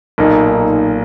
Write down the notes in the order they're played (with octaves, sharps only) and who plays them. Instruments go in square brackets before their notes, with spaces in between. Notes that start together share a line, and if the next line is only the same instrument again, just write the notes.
[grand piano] B1 A#2 A#3 D#4